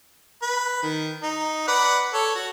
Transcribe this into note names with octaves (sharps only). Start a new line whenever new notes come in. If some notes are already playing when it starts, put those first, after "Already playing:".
B4
D#3
D#4
B4 D5 F#5
A4 C#5
F#4